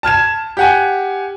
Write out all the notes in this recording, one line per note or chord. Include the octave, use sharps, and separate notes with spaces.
A5 F6 G#6 E7
G4 F#5 G#5